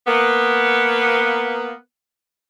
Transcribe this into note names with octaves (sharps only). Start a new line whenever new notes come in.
A#3 B3